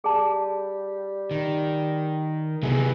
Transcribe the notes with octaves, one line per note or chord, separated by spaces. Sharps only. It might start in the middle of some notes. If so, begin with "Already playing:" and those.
G3 G#4 A5
D#3
C3 E3 F#3 B3 G#4